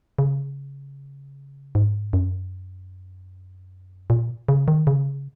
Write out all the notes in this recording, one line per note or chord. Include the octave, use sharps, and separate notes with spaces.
C#3
G#2
F#2
A#2
C#3
D#3
C#3